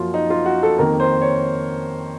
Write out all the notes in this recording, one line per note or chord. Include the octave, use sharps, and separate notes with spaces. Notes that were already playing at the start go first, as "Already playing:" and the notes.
Already playing: F#2 F3 A#3 C#4 F4 F#4
D#4
F4
F#4
A4
F2 D#3 A#3 A#4
C5
C#5